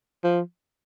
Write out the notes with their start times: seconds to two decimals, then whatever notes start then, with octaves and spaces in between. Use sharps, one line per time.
0.24 F3